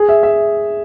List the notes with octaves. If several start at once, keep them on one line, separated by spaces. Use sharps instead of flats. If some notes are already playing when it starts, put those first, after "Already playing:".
Already playing: G#4
E5
E5